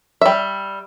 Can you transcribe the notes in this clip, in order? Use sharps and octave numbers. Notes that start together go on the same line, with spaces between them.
G3 E5